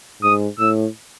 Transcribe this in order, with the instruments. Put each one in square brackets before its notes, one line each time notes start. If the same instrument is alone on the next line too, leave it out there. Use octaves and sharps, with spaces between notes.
[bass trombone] G#2 [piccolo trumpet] D#6
[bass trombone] A2 [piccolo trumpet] E6